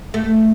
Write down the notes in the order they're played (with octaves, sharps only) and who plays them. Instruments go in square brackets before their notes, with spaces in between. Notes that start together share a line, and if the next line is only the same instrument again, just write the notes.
[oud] A3